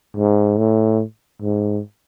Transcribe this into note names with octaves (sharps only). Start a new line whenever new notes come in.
G#2
A2
G#2